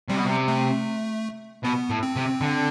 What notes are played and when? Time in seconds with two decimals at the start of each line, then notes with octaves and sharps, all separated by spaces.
0.10 C3 G3
0.18 B2
0.27 C3
0.48 A3
1.64 B2 B3
1.90 A2
2.03 C4
2.16 C3
2.41 D3